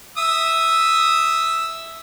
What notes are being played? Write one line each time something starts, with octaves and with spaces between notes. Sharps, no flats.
E5 D#6 E6